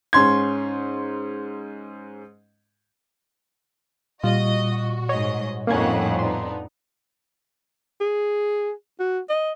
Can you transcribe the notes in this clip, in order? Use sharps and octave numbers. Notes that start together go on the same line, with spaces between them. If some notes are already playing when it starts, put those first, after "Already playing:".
G#2 C#4 C6 G#6
A#2 G3 F4 F#4 D#5
G#2 C#5 D#5 C#6
F2 A2 A#3 C#4 D#4 F#5 G#6
B3 D4 D#4 C6
G#4
F#4
D#5